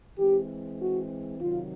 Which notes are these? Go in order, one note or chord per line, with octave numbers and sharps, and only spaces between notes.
E3 G#3 C4 G4
F#4
C3 D#3 F#3 F4